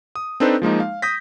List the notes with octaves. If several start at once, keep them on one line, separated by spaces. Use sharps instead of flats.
D#6
C4 D4 D#4 A4 B4 C5
F3 G#3 A#3 D#4
F5
D#6 G6 A#6 B6